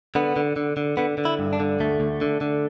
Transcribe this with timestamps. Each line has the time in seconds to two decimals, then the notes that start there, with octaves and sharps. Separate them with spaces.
0.15 D3 B3
0.36 D3
0.56 D3
0.77 D3
0.97 D3 B3
1.18 D3
1.25 E4
1.39 G2
1.53 D4
1.60 D3
1.80 D2 A3
2.00 D2
2.21 D3
2.41 D3